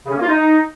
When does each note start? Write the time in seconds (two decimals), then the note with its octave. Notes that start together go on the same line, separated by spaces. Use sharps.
0.06 C#3
0.11 C#4
0.17 A#3
0.22 F4
0.27 D#4